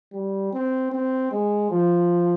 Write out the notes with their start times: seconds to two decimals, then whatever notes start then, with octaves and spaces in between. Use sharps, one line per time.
0.13 G3
0.53 C4
0.92 C4
1.32 G#3
1.71 F3